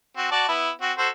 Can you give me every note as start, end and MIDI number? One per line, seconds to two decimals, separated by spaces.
0.17 0.30 60
0.17 0.30 66
0.32 0.48 66
0.32 0.48 74
0.32 0.48 81
0.48 0.70 59
0.48 0.70 64
0.81 0.92 60
0.81 0.92 66
0.98 1.09 66
0.98 1.09 69
0.98 1.09 72